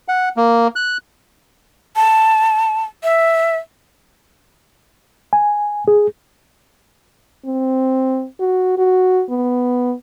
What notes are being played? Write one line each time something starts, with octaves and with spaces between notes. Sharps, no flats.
F#5
A#3
F#6
A5
E5
G#5
G#4
C4
F#4
F#4
B3